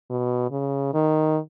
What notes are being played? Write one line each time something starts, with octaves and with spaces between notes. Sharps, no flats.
B2
C#3
D#3